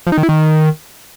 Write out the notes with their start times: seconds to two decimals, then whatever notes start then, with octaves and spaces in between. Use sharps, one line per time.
0.07 F3
0.12 D#4
0.18 D#3
0.23 E4
0.29 D#3